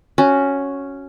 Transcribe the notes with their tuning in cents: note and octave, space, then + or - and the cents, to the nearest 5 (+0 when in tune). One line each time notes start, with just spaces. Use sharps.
C#4 +0 F#4 +0